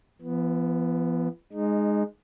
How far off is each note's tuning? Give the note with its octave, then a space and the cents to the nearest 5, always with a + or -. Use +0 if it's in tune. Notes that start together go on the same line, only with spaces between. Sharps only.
F3 -45 B3 +0
G#3 +0 D#4 -20